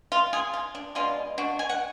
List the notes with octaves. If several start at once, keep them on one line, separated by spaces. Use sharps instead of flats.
F4
F4 G#4
F4
D4
B2 G#3 D4 F4
D4 F#4
G#5
F#5